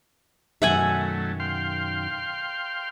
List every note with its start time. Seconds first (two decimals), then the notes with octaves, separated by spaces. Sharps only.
0.62 F#2 B2 D#3 F#3 A3 E5 F#5 G#5
1.40 F5 G5 C6